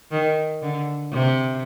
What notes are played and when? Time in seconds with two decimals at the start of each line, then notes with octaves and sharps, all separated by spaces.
0.11 D#3
0.62 D3
1.12 C3